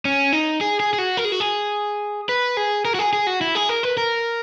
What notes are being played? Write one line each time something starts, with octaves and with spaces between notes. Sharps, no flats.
C#4
D#4
G#4
G#4
G#4
F#4
A#4
G#4
F#4
G#4
B4
G#4
A#4
F#4
G#4
G#4
F#4
E4
G#4
A#4
B4
A#4